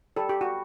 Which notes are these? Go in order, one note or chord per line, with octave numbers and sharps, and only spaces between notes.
G3 A4
G4
F#4